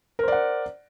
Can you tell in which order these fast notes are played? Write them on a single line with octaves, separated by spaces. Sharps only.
A#4 C5 D5 F#5